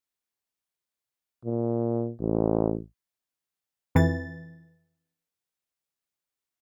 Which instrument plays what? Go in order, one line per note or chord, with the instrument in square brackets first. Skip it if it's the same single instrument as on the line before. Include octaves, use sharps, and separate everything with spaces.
[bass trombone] A#2
A1
[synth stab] F2 E3 A6